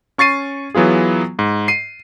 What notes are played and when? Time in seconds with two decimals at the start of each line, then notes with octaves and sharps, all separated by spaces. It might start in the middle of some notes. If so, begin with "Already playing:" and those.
0.18 C#4 C#6 A6 C7 D#7
0.75 E3 F#3 B3 F4 G#4
1.39 G#2
1.68 C7 D#7